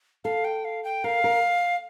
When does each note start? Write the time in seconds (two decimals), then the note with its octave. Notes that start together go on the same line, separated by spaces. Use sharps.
0.24 A4 F5
0.44 G5
0.65 F5
0.84 G5
1.04 A#4 F5
1.24 A#4